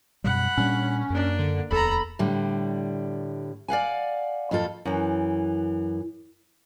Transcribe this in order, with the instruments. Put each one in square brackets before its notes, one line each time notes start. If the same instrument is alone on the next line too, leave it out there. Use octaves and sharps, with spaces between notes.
[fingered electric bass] F#2 B2 G3 [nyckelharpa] F#5 B5
[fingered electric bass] A#2 G3 D4 [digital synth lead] C#4
[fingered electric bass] F#2 [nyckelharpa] A#3 D4
[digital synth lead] D3
[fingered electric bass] D1 E2 [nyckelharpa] A4 A#5 [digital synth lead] B5
[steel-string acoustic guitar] A2 D3 G3
D5 F5 F#5 G#5
F2 F3 F4 A4
[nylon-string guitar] F#2 E3